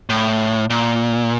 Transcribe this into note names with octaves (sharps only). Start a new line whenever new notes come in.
A2
A#2